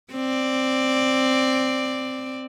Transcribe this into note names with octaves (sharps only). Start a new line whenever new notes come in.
C4 D5